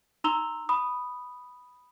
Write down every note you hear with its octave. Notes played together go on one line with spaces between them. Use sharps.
D#4 A#5 C6 E6 F7 G7
B5 D#6